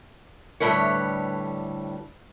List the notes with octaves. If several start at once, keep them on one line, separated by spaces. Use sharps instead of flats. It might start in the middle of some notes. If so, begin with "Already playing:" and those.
D2 A2 C#3 G3 B4 C#5